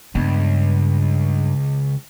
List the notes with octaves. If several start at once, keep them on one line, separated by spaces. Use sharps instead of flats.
C#2 G2 B3